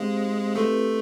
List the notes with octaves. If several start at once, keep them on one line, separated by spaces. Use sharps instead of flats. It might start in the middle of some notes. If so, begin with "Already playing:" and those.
Already playing: G#3 C4 D#4 G4 C5 F5
A3 C4 E4 G4 B4 D#5